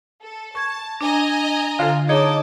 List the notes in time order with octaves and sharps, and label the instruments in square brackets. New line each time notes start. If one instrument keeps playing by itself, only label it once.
[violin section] A4
[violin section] A5 [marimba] C#6 G#6
[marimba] D4 [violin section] D#5 G#5 A#5
[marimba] D3 A4 [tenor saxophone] F4
[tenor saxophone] D#4 [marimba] G#4 C#5 [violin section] A5 D6